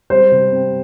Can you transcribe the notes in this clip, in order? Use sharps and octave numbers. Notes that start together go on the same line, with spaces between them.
G3 C5
C3
C4